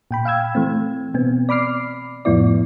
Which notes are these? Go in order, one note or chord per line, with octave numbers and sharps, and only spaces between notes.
A#2 G5 B5
F5 G5 E6 G#6
E3 A3 C4
B2 B3 C4
D5 B5 D6 F6 C7
F2 A2 F3 B3 E4 D5